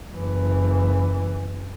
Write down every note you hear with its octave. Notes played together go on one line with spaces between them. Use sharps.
F#1 E3